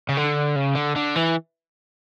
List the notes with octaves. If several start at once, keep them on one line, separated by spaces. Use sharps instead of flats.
C#3
D3
C#3
D3
D3
E3